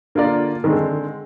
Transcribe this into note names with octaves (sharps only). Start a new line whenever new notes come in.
D3 A#3 F4 A#4 D5
D3 D#3 G#3 C4